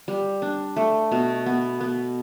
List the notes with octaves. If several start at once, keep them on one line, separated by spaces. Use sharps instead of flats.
G3
D4
A3
B2
B3
B3